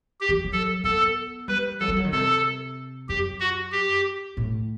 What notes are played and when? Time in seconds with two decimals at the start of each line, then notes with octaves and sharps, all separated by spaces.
0.21 G4
0.29 E3
0.44 F#3
0.53 A4
0.84 B3 A4
1.48 G3 B4
1.80 F#3 A4
1.88 G3
1.97 F#3
2.05 D#3
2.13 C3 A4
3.09 F#2 G4
3.40 F#4
3.72 G4
4.37 A2